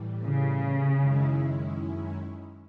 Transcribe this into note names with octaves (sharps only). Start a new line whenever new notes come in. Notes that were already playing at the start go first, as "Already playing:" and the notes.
Already playing: A2 E3 G3
C#3
F#2 D#3 G#3 C#4 E4